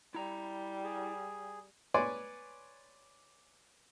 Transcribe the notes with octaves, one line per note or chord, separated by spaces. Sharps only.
G3 E4 A#5
G#4
B4 C#5 D5 G#5 C6